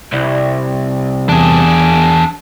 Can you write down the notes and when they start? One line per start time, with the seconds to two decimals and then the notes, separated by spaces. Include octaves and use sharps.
0.13 C2
1.29 E2 D4 G#4